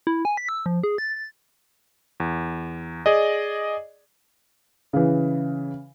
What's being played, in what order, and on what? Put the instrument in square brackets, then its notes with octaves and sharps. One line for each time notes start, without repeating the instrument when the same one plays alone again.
[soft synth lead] E4
G#5
B6
E6
F3
G#4
A6
A6
[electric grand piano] E2
G#4 D5 D#5
[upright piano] C#3 E3